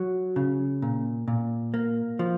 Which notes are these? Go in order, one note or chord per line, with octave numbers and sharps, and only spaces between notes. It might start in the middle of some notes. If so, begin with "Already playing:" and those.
Already playing: F#3
C#3
A#2
A#2
A#3
F3